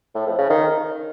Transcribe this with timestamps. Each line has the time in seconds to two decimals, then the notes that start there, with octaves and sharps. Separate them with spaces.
0.15 A2
0.27 F2
0.38 C#3
0.50 D#3